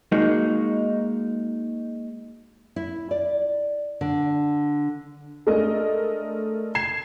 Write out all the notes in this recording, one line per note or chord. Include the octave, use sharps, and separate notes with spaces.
G#3 A#3 D#4 F#4
E4
D5
D3
G#3 A3 D4 A4 A#4 D#5
G#6 C7 E7